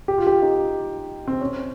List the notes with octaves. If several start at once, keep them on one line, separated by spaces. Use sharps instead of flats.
G4
F4
G4
D#4
C4
C#4